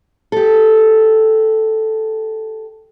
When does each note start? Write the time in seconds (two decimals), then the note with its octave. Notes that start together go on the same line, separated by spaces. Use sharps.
0.32 G4 A4